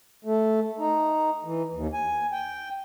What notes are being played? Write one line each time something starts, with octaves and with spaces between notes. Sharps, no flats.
A3
D#4
E3
D#2
G#5
G5